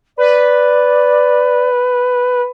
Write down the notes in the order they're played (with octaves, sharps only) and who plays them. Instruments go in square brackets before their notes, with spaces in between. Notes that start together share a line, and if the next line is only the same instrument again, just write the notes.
[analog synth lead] B4 [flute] D5